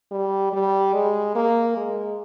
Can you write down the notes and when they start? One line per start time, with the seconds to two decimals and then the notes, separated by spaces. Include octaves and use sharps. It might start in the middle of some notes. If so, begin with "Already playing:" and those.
0.11 G3
0.53 G3
0.94 G#3
1.35 A#3
1.77 G#3